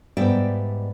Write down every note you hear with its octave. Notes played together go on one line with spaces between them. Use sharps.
G#2 G3 B3 D5 E5 G5